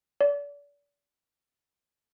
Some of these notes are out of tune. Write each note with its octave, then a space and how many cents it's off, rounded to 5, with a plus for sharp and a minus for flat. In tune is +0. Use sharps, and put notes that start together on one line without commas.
D5 -35